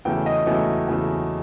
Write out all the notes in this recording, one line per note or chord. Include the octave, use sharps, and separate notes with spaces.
E2 C#3 F#3 A3 G5
D#5
E2 C#3 F#3 A3
E2 C#3 F#3 A3